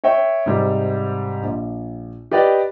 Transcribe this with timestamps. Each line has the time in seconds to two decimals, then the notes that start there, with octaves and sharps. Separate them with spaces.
0.04 C#5 E5 G5
0.46 G#2 C3 G3
1.43 A#1
2.31 G4 B4 D5 D#5 G5